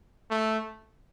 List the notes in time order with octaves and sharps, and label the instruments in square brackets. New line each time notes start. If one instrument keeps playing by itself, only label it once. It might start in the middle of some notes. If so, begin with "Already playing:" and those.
[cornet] A3